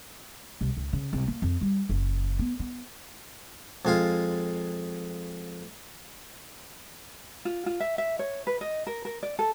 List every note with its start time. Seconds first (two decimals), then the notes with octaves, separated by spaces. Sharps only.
0.61 C2
0.77 C#2
0.93 C#3
1.13 C2
1.27 A#3
1.42 F2
1.61 G3
1.89 F#1
2.39 B3
2.60 B3
3.85 F2 G#3 F4
7.45 F4
7.66 F4
7.80 E5
7.98 E5
8.19 C#5
8.47 B4
8.61 D#5
8.87 A#4
9.05 A#4
9.23 D5
9.39 A4